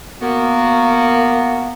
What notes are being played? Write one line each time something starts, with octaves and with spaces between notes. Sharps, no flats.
A#3 B3 F#4